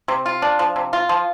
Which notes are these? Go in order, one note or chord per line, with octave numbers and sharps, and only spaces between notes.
C3
F4
D4
F3
C3
F4
F3